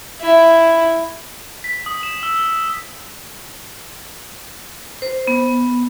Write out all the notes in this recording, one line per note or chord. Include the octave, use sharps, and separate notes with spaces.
E4
B6
D#6
E7
E6
C5
B3